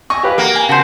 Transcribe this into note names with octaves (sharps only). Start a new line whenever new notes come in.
D#5 E5 G#5 C#6
G4 B4 F5
A#3 F#4 A#5
G#5
C#3 F#4 C5 A5 C6